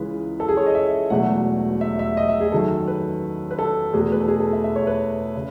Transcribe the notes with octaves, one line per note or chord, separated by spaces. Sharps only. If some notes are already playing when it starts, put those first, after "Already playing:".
Already playing: C#2 C#3 E3 G#3 B4
A4
G#4
C#5
D#5
E5
E1 E2 B2 F#3 A3 F#5
E5
E5
D#5
E5
G#4
F#2 D#3 F#3 A4
B4
B4
A4
E2 B2 A3 G#4
B4
A4
G#4
A4
E5
E5
C#5
B4
C#3